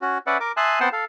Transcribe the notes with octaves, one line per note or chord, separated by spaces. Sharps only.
C#4 F#4
C#4 B4 D5 E5 F#5
A#4 D6
E5 G#5 A5 C6 D#6 F#6
B3 C4 F#5 G5 A5 C6
A4 F5